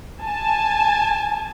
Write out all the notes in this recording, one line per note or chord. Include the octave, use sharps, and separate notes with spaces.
G#5 A5